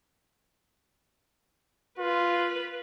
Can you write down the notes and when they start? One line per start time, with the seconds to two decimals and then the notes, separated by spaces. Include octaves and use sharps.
1.99 F4 B4